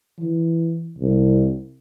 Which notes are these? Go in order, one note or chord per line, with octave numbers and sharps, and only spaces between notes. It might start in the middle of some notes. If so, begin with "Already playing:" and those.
E3
C2